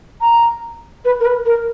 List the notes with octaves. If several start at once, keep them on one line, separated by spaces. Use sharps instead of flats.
A#5
B4
A#4
B4
A#4